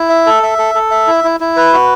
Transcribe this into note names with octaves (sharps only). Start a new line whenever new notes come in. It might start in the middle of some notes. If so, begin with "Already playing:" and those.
Already playing: E4
E5
A4
E5
A4
A4
E5
E4
E4
E4
B4
F#4